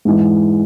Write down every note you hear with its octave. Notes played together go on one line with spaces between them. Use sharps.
G#2 E3 G#3